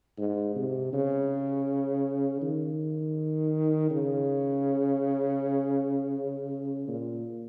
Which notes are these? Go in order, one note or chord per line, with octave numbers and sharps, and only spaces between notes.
G#2
C3
C#3
D#3
C#3
A#2